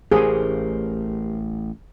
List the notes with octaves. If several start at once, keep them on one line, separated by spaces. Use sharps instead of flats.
A1 A3 G4 G#4 A#4 C5